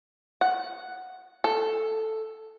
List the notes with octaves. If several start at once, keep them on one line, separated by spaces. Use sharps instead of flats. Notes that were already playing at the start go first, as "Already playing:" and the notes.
F#5
A4